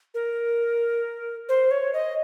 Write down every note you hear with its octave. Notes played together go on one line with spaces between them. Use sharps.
A#4
C5
C#5
D#5